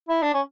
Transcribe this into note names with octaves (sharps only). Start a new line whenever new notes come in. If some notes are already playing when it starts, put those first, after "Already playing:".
E4
D4
C#4